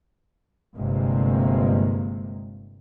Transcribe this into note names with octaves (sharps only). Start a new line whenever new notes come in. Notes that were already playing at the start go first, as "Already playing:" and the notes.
G1 G2 C3 G#3 A#3